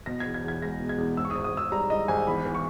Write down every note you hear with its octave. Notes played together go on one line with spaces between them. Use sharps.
B2 A#6
G#6
E2
G#6
E2
G#6
G#3 A#6
B2
G#6
E2
G#2 E6
C#6
D#6
G#1
D#6
G#1 E6
G3 A#5
G#2 D#5
G#1 G#5
E2 B5
E3
C#6